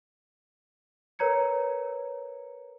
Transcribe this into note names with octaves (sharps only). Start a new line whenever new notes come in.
A#4 B4 C#5 A#5 G#6 C#7